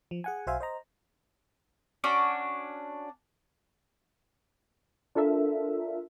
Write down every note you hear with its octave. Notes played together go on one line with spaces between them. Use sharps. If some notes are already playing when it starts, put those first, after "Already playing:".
F3
G#4 F#5 G#5
B1 F#4 C5 E5 F5 G#5
C5 D#5 A#5
C#4 D4 F#4 D6
D4 F4 A4 A#4 E5